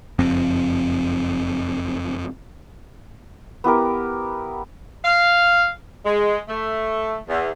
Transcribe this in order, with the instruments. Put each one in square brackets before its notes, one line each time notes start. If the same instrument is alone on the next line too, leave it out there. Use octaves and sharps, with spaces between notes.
[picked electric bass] F#1 F2 C4
[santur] B3 E4 G4 A#4
[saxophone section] F5
G#3
A3
E2